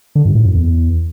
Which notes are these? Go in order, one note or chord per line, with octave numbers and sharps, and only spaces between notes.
D3
G2
A2
F#2
E2